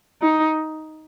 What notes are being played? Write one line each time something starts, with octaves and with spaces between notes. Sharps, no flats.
D#4